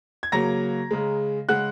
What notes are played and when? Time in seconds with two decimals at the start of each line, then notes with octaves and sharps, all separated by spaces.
0.23 G#6
0.32 C#3 F#3 A#3 A#5 A#6
0.91 C#3 G#3
1.48 C#3 G#3 F#5 F#6